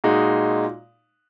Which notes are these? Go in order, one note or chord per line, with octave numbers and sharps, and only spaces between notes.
A#2 G#3 D#4 F#4